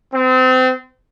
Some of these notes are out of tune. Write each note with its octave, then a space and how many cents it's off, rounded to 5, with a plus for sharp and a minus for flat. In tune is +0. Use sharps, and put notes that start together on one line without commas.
C4 -30